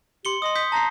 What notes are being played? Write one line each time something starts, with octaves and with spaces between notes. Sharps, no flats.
G4 C6 C#7 G7
D#5 C6 D#6
D#6 G6 B6
A5 A#5 G6 C7